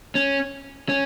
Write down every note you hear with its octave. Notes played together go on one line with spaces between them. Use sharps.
C#4
C#4